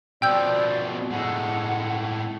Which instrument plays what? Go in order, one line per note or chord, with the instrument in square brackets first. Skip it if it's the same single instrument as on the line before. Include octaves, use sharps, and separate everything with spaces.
[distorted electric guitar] B2 F3 [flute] D5 [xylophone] G5 E6 G6
[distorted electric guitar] A2 G#3 [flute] F#5